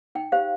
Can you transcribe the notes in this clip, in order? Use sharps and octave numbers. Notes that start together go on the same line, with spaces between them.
D#4 G5
G4 C5 F5